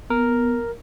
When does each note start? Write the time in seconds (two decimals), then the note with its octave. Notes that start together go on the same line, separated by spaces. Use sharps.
0.10 B3 A#4